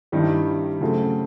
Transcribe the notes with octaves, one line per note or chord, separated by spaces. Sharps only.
G2 D#3 G3 C4 E4
C#3 F#3 A3 C4